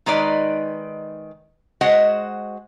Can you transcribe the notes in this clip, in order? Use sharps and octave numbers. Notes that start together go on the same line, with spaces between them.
D#3 G#3 D#4 B4 D5
G#3 F#4 C5 D#5 F#5